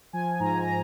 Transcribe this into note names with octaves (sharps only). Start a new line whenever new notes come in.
F3 G#5
G#2 A#5
A#5